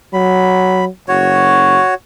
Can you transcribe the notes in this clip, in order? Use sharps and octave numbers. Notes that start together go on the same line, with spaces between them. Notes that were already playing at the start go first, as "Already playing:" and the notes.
F#3 B5
F#1 F#4 C#5